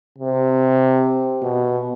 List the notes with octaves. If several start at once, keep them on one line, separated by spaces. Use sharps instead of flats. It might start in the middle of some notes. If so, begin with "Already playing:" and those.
C3
B2